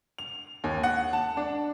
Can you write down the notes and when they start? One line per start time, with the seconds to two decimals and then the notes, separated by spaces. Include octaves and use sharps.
0.18 F7
0.64 D#2
0.83 F#5
1.13 A5
1.37 D4